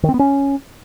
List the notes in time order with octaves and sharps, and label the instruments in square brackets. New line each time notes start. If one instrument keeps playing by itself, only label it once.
[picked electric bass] D#3
C4
B3
C#4